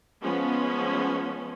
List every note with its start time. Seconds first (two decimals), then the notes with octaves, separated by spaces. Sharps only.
0.22 F3 G#3 B3 C#4